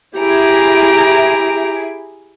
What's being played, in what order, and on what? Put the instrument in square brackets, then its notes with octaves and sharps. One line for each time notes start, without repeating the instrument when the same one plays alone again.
[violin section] E4 G#4 D7 [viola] G4 A#5